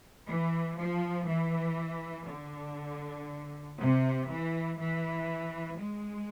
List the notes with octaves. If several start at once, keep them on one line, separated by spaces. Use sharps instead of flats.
E3
F3
E3
D3
C3
E3
E3
G#3